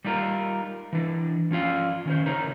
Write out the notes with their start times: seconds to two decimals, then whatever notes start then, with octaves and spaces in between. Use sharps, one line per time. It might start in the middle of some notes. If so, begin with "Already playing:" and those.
0.04 G3 D#4 F4 A#4
0.93 E3 D4
1.51 F3 C#4 F4 F5
2.05 D#3 C#4 C5
2.26 C#3 D#4 A#4 C#5